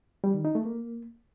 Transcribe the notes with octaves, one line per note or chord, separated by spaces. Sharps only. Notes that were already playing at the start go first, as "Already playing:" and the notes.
G3
D#3
D#4
A3
A#3